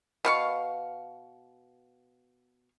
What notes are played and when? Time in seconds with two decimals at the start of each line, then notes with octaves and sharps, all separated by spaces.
0.25 B2 F5 C#6